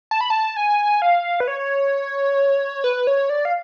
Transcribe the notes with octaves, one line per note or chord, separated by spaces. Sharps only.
A5
B5
A5
G#5
F5
B4
C#5
B4
C#5
D5
F5